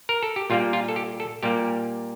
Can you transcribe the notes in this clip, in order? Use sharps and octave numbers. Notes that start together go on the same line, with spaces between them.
A#4
A4
G4
A#2 G3 A#3 F4
F4
A4
G4
A4
A#2 G3 A#3 G4